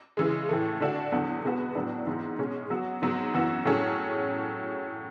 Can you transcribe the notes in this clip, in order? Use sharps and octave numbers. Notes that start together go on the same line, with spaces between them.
C#3 E3 G#3
A2 E3 A3
D3 A3 D4 F#4
E2 D3 F#3 B3
B2 G#3 B3 F#4 B4
A2 F#3 B3 D4
G#2 E3 B3
B2 G#3 C#4
F#3 B3 F#4
G#2 F#3 B3
F#2 E3 B3 F#4
A2 F#3 A3 C#4 G#4